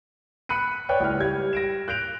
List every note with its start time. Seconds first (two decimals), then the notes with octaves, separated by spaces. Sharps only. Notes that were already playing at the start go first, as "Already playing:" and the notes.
0.49 B5 F#6 C#7 D#7
0.89 B4 C#5 D5 G5 F#6
1.00 C#2 E4 F6
1.19 G3 G#6
1.53 A#6 D7 E7
1.88 F#6 G6 D7 F7